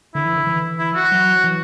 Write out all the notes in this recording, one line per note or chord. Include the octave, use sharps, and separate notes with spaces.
D3 E4
E3
D3
E3
E4
F#4
F#3
E3